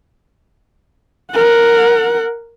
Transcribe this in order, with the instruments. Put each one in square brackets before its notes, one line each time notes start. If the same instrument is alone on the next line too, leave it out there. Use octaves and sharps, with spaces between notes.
[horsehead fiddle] A#4 F#5